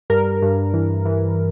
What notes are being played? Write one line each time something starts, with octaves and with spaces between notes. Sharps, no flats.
G2 A#4
G2
E3
E3